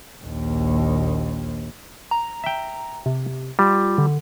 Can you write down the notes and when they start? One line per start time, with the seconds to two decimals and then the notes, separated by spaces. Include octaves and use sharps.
0.23 A#1 D#2
2.11 A#5
2.44 E5 G5
3.06 C3
3.59 G3 F4
3.98 D3